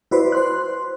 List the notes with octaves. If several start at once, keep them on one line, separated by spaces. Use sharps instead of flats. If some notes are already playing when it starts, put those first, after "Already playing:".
E4 F#4 B4 C5 D5
C5 C6 F#6